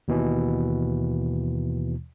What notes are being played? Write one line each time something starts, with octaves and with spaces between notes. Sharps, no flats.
D#2 B2 E3